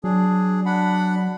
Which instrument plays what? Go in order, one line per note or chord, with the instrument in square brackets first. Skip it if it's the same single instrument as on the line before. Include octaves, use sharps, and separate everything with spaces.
[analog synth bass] F#3 [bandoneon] D4 G#4
[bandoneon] D4 F#5 B5